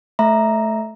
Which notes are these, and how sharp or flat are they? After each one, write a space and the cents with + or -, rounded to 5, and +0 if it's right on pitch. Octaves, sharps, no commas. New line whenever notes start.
A3 -15 E5 +0 A#5 +0